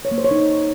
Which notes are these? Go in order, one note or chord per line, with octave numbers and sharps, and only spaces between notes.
C#5
A#3
C5
C#5
D#4